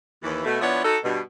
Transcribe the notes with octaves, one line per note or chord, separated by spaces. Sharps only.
D#2 E3
B2 A3
F3 B3 D4 E4 C#5
D#4 F#4 A4
G2 B2